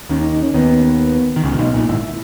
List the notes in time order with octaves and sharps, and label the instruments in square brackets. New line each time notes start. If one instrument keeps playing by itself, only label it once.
[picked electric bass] D#2 D#3 [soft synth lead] C#4
[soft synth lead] D#4
D#4
C#4
[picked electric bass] D#2 D#3 [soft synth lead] B3
[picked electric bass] D#3
[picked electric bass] C#2 C#3 [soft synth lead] C#4
[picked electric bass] A#2
[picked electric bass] B1 B2 [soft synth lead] D#4
[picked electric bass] A#1 A#2 [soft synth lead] D#4
[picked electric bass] G#1 G#2 [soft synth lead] E4
[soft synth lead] E4